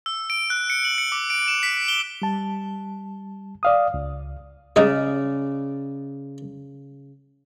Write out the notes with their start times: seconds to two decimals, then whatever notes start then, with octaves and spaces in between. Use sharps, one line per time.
0.06 E6
0.30 D7
0.50 F#6
0.70 C#7
0.85 F#7
0.98 C#7
1.12 D6
1.30 D7
1.48 E7
1.63 B6
1.88 G7
2.22 G3 A5
3.63 D5 F5 D#6
3.94 C#2
4.76 C#3 G#3 D#4 G#4 D5